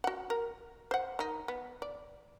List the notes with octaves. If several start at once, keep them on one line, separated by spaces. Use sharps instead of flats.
F#4 F#5
A#4
C5 F#5
D#3 D#4
B3
D5